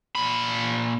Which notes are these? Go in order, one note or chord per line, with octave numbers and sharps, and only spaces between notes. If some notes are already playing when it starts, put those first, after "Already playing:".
A#2 B5